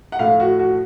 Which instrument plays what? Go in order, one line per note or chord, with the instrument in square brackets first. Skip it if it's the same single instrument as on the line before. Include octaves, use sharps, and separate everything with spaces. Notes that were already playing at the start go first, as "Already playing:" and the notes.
[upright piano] F#5
A2 F3 A3 F5
F#4
F#4